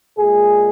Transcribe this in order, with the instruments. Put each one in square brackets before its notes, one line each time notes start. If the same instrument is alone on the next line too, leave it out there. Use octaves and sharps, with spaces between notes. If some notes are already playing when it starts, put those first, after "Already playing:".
[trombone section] A#2 G#3 G#4